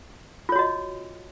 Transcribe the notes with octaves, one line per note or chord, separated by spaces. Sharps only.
F4 F#4 C#5 D#5